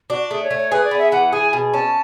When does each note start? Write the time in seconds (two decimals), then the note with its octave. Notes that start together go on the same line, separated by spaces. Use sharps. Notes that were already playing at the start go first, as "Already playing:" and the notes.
0.10 D4 F#4
0.30 A3 G#4
0.44 C#5
0.51 A3
0.58 C#5
0.72 G#4 B4
0.84 D5
0.91 B3
0.98 E5
1.12 E3 F#5
1.33 G#4 G#5
1.53 B2
1.73 C#4 A5